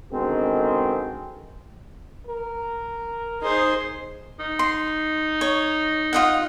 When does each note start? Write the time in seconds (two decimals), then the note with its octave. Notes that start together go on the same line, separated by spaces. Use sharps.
0.11 B2 D3 D#3 G#3 C4
2.27 A#4
3.42 D#4 G#4 C5
4.39 D#4
4.59 C6
5.41 C#5
6.13 F4 D#5 F#5